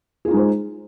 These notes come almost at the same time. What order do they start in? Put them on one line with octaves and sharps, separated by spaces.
G#4 F4 D#4 G#3 C5